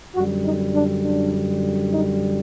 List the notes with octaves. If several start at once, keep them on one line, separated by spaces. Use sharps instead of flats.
F#2 D3 G3 F#4
D#4
D4
D4
D#4